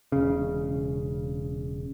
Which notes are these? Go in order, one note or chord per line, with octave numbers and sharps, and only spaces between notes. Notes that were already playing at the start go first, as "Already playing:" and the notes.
E1 C#3